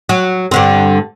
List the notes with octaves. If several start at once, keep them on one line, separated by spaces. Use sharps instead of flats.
F#3
G2 D3 C4